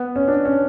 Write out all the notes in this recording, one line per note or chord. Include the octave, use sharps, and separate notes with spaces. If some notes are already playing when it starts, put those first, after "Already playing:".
Already playing: B3
C#4
D4
C#4